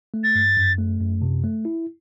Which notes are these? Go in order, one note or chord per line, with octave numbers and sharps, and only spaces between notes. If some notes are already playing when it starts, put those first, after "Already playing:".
A3
A6
G2
F#2
A3
F#2
C3
A3
E4